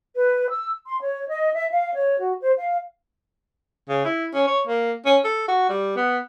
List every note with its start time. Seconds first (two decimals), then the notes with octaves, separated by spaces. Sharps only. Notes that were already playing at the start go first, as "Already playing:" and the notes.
0.15 B4
0.49 E6
0.85 C6
1.01 C#5
1.27 D#5
1.54 E5
1.70 F5
1.94 C#5
2.19 F#4
2.40 C5
2.56 F5
3.89 C#3
4.05 E4
4.34 C#4
4.47 C#5
4.67 A#3
5.06 C#4
5.24 A4
5.48 F#4
5.69 G3
5.96 B3